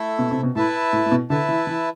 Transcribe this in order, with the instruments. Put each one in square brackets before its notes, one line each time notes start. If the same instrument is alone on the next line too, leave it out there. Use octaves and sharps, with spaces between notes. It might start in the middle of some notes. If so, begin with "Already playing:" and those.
Already playing: [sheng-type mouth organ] A3 E4 A4 E5
[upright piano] B2
C3
B2
[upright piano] A2 [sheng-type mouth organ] E4 B4 E5 A5
[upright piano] A2
A2
B2
[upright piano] D3 [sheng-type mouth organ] E4 B4 E5 A5
[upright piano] E3
E3